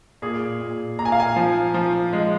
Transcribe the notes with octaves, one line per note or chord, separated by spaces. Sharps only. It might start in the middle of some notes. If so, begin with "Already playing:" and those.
A#2 G#4
A#2
A#2 A#5
G#5
F5
G#5
F3
F3
G#3